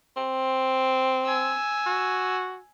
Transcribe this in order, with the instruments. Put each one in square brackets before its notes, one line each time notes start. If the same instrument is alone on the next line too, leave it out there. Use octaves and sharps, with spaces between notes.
[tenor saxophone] C4
[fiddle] G#5 E6
[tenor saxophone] F#4